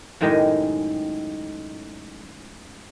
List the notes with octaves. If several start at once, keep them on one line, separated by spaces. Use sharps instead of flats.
F#2 A2 D#3 G#3 G4 D#5